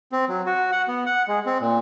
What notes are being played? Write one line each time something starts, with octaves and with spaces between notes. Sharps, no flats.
C4
F#3
F#4
F#5
B3
F#5
G#3
C4
A#2